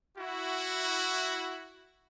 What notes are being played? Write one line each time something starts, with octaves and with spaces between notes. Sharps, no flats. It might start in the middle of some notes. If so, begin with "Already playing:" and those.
E4 F#4